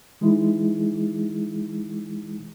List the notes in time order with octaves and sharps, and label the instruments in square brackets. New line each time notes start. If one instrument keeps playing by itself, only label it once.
[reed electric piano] E3 G#3 D#4 E4 G#4